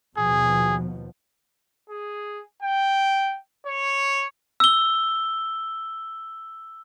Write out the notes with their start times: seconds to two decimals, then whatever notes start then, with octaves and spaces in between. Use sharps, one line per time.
0.17 D#2 B2 F3 G#4
1.90 G#4
2.62 G5
3.66 C#5
4.60 E6 G7